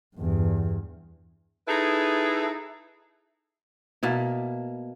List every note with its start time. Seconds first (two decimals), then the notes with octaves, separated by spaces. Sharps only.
0.16 E2 G2
1.67 D#4 E4 G#4 A4 B4
4.03 B2 A#3 E4